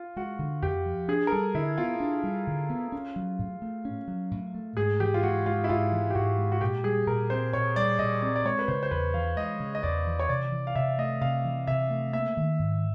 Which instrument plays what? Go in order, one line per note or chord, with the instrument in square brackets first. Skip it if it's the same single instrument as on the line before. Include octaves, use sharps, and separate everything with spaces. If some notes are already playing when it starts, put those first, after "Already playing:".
Already playing: [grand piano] F4
[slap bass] G#3 [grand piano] F#4
[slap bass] D3
[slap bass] F2 [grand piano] G4
[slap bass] F3
[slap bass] D4 [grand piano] G#4
[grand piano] A#4
[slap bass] G3 [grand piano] A4
[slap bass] D3 [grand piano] E4
[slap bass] B3 [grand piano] F4
[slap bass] D4
G3
D3
B3
C#4
F#3
A2
A3
C#4
F#3
A2
A3
[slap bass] G#2 [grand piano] G#4
[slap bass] E3 [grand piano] G4
[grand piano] F4
[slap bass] G#2 [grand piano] F#4
[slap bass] G#3 [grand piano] F4
[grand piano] E4
[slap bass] G#2 [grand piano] F4
[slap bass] E3
[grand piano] G4
[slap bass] G#2 [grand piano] F#4
[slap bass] G#3
[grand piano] F#4
[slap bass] A#2 [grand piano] G4
[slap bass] G3 [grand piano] G#4
[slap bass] A#2 [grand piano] A#4
[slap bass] C4 [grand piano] C5
[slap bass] A#2 [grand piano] C#5
[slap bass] G3 [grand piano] D5
[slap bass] A#2 [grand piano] D#5
[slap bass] C4 [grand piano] D5
[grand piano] D5
[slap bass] G#3 [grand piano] C#5
[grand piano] B4
[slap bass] C#3 [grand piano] C5
[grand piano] C5
[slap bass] E2 [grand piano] B4
[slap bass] E3 [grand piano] F5
[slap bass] G#3 [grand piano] D#5
[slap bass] C#3
[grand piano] D#5
[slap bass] E2 [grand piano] D5
[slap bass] E3
[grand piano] C#5
[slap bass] C3 [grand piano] D5
[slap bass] E3
[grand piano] F5
[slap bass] C3 [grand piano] E5
[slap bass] A3 [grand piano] D#5
[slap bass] C3 [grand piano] F5
[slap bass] E3
[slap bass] C3 [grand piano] E5
[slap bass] A3
[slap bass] A#3 [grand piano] E5
[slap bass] D#3
G#2